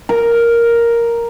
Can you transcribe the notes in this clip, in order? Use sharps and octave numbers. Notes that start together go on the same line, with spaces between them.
A#4